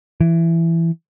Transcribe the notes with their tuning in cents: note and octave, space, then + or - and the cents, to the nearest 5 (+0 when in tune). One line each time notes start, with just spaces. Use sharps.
E3 +10